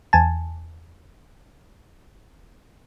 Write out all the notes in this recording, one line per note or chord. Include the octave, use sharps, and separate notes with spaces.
E2 G#5 A5